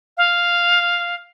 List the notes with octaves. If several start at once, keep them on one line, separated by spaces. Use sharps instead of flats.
F5